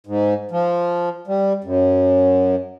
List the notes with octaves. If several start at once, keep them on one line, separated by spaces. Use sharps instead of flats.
G#2
F3
G3
F#2